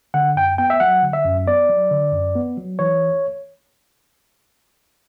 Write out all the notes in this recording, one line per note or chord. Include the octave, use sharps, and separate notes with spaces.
D3 F#5
F#2 G5
B3 G5
E5
F#3 F#5
D3
E5
F#2
B3 D5
F#3
D3
F#2
B3
F#3
E3 C#5